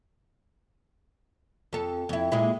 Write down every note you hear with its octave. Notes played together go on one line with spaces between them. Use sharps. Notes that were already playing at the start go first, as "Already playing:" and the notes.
F2 A4
F2 E4
A#2 G#3 E4